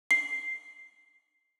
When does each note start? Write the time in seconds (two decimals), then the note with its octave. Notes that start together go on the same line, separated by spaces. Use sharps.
0.11 C7